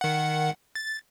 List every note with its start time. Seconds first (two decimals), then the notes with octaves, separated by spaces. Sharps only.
0.01 D#3 F#5
0.75 A6